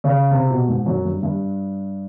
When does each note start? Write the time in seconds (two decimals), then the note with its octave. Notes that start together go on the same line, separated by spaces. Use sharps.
0.04 C#3
0.31 C3
0.50 B2
0.68 G#2
0.86 F#2
1.05 G2
1.23 G2